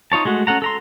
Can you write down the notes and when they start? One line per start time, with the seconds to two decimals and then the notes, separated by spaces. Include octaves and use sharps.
0.12 D#4 F4 C#5 A5
0.25 G#3 A3 F#4
0.47 C#4 A4 F#5 A#5
0.62 A4 A#5 C6